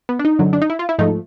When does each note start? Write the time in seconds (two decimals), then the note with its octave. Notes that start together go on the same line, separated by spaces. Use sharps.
0.09 B3
0.19 D4
0.25 D#4
0.39 F#2 D3 F#3
0.53 D4
0.62 D#4
0.70 E4
0.79 F4
0.89 E4
0.99 G#2 F3 A3 D#4